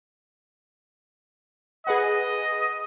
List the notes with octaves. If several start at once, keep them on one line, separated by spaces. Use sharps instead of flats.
G#4 B4 D#5 F#5